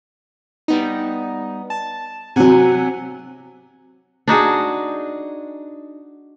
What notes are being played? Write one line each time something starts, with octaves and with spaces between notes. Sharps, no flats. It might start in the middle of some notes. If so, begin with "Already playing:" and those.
G3 B3 D#4
A5
C3 F#3 F#5 G#5
D4 D#4 F#4 G#4